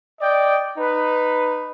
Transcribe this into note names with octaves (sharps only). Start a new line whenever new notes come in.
D5 D#5 G5
D#4 B4